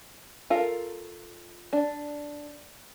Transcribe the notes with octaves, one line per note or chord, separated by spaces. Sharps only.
F4 A4 A#4 F5
D4